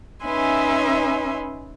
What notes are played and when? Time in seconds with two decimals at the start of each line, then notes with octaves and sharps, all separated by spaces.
0.23 C#4 D#4 B4 E5 G#5 C6